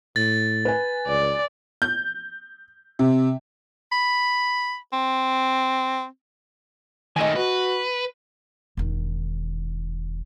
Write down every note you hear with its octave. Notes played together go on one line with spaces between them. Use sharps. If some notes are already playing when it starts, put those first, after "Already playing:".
A2 A6
B4 G#5
C#2 D5
G6
C3
B5
C4
D#3 A3 D#5 G#5
F#4 B4
E1 D#3